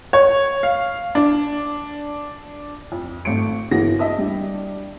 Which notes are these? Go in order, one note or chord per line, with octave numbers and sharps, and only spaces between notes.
C#5
F5
D4
F2
G#1 A3 C#7 D7
G1 E3 A#3 F#4 G#4 A#6
D#5 E5 A5 D#6
G3 D4 G4